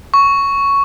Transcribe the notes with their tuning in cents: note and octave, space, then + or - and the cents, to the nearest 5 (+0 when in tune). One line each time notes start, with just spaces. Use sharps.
C#6 +5